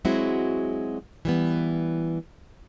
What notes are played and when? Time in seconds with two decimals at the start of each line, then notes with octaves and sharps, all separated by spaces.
0.05 F#3 G#3 C4 E4 F#4
1.25 E3 G3 B3